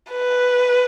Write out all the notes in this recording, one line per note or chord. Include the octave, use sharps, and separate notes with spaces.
B4